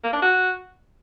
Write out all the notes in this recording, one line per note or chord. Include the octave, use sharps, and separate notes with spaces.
A#3
D4
F#4